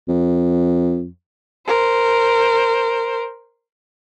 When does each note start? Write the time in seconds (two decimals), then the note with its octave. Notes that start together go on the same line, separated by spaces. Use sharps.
0.08 F2
1.67 A#4 C5